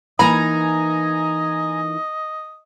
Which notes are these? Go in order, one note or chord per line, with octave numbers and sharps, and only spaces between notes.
E3 A#3 D#4 D#5 G#5 A#5 B5